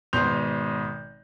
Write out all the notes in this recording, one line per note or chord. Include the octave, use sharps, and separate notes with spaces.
G#1 B2 C6 G6 F7